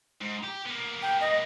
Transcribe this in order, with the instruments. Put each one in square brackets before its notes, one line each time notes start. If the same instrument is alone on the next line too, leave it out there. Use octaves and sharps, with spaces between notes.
[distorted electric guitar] G#2
G4
A#3 B3
[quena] G5
D#5